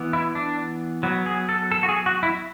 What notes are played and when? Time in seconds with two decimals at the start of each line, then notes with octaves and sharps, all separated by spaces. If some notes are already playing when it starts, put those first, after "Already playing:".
Already playing: E3 B3
0.13 E4
0.35 D4
1.03 F#3 B3
1.26 G#4
1.49 A4
1.72 A4
1.83 F#4
1.89 G#4
2.06 F#4
2.23 E4